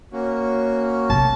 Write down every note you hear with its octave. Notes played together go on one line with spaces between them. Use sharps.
A#3 C#4 F#4
A#1 C3 A5